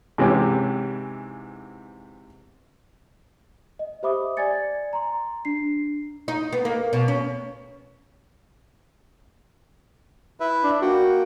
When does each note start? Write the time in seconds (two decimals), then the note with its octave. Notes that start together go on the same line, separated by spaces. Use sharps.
0.18 G#2 C3 E3 C#4 G4
3.79 D#5
4.03 G4 C5 E5 B5 D6 D#6
4.37 D5 G#5 G#6 A6 C#7
4.93 A#5 C6
5.45 D4 C7
6.28 D#4
6.53 B3
6.65 A#3
6.93 B2
7.08 C#4
10.40 E4 B4 E5
10.64 D4
10.82 A#3 F#4 G5